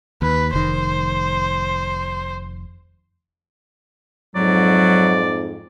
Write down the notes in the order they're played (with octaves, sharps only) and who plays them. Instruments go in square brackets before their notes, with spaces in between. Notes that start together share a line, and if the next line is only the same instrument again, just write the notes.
[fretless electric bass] D#2 [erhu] B4
[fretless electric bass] F1 D#3 [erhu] C5
[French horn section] F2 G#2 [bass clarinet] F#3 [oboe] D5